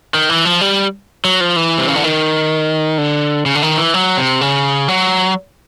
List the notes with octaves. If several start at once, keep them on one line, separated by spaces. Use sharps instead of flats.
D#3
E3
F3
G3
F#3
F3
E3
C3
C#3
D3
D#3
D3
C#3
D3
D#3
E3
F#3
C3
C#3
F#3